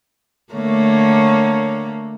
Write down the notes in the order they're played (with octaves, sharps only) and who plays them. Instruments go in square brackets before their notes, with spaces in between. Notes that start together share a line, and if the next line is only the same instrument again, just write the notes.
[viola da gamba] D3 A3 A#3 [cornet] C#5